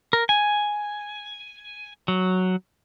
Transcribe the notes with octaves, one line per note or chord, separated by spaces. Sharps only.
A#4
G#5
F#3